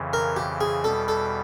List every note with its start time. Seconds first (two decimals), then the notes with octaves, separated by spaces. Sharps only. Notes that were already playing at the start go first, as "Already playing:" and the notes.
Already playing: F2 C#3 E3
0.13 A#4
0.36 G4
0.61 G#4
0.84 E2 B2 G3 A4
1.08 A4